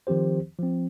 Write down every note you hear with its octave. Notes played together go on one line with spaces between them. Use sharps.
D#3 F3 C4 G4 C5
F3 C4